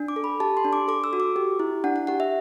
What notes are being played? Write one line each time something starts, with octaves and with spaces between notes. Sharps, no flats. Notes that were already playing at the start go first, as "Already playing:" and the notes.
Already playing: D4
D6
A4
B5
G4 A5
C6
D4
D6
A4 D6
E6
F#4
D6
G4
E4
D4 F#5
F#5
G4 F#5
E5